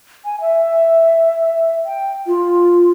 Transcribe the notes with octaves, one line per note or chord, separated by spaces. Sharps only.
G#5
E5
G5
F4